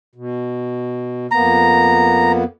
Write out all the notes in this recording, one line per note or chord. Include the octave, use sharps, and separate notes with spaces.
B2
F2 A#3 B3 A#5